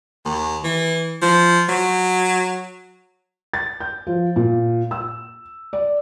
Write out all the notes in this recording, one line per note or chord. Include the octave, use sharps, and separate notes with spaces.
D#2
E3
F3
F#3
A6
G6
F3
A#2
E6
D5